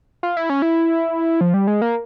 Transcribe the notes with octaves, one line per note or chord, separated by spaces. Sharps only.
F4
E4
C#4
E4
F3
G3
G#3
A#3